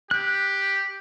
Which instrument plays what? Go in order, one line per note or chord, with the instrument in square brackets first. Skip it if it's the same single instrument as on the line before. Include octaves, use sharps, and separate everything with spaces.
[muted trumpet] G4 [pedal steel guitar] F#6